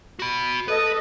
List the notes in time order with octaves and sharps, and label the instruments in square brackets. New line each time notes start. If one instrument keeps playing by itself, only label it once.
[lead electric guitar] F#4 B5
[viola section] A4 D#5 [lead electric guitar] B4